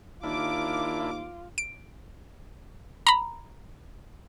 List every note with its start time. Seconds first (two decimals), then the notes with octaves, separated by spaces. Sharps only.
0.23 D#2 A#3 D4 E4 F4 D6
1.58 D7
3.07 A#5 B5